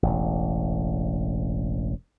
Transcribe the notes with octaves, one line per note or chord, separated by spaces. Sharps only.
E1 A1